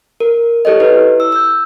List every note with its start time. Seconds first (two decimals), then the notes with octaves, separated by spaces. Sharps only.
0.20 A#4
0.65 E4 G4 A4 C#5 D#5
0.80 E4 B4
1.20 E6
1.32 E6 G6